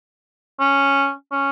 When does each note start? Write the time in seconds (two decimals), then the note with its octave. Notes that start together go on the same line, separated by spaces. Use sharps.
0.60 C#4
1.32 C#4